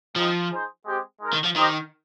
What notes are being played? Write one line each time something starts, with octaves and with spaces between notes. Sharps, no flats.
F3 G#3 C4 D#4
D#4 G#4 C5
G#3 C4 G4
G#3 D#4 A#4
D#3
F3
D#3 D#4 G4 C5 D#5